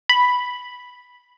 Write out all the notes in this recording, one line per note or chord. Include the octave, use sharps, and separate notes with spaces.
B5